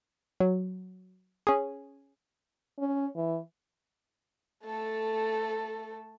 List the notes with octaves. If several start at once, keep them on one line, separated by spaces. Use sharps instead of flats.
F#3
C#4 G#4
C#4
E3
A3 A4